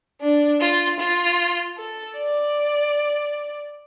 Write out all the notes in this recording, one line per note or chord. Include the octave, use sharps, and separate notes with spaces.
D4
F4
F4
A4
D5